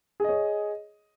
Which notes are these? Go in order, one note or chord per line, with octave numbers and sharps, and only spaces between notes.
G#4 C#5 D#5